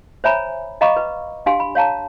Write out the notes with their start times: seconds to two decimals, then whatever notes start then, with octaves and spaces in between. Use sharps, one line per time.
0.24 C5 C#5 E5 G#5 A#5 B5
0.81 D#5 F5 A#5 B5 C#6 D6
0.97 B4
1.46 D4 G4 F5 G#5 C6
1.60 B5
1.75 C#5 F5 A5 A#5